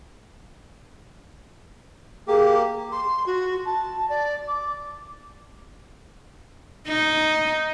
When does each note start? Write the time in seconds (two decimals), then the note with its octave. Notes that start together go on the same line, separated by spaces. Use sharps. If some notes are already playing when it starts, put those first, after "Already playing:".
2.28 A#3 G4 G#4
2.91 C6
3.25 F#4
3.65 A5
4.09 D5
4.47 D6
6.88 D#4